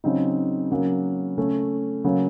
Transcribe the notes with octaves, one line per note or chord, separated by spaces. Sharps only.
C#3 F#3 C4 D#4
C#3 F#3 A#3 C#4
C#3 A3 C#4
C#3 F#3 A#3